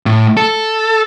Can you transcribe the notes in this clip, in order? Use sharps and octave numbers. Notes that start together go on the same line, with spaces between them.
A2
A4